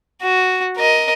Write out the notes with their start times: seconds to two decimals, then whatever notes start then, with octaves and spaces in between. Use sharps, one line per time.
0.22 F#4
0.77 A#4 D#5